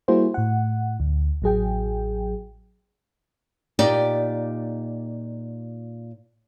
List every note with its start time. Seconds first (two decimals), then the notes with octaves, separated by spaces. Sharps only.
0.08 G3 A#3 E4 F#4 G#4 C5
0.34 A2 F#5
1.00 D2
1.42 A1 F#3 G#4 G5
3.79 A#2 D#4 G4 D5 G5